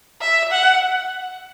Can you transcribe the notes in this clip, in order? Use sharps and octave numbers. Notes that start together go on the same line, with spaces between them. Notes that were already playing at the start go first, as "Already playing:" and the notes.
E5
F#5